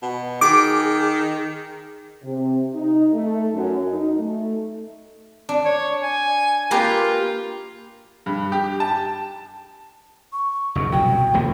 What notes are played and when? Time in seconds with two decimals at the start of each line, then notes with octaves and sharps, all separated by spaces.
0.02 B2
0.41 D#3 G#4 D6
2.23 C3
2.74 D#4
3.13 A3
3.53 F#2
3.87 D#4
4.19 A3
5.49 D4
5.65 C#5
6.03 G#5
6.71 A#3 F4 G4 B4
8.26 G2
8.52 G4
8.80 A5
10.32 C#6
10.75 F#1 F#2
10.92 C2 B2 F#3 G5
11.34 D#1 C#2 A#3